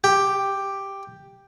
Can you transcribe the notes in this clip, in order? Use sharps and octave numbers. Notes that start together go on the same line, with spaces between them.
G4